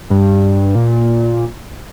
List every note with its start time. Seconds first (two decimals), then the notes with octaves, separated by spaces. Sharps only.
0.10 G2
0.75 A#2